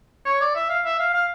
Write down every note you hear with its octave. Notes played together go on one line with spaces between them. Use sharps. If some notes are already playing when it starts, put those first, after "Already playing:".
C#5
D5
E5
F5
E5
F5
F5